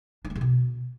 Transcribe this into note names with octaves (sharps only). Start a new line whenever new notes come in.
D4
A3
C3
B2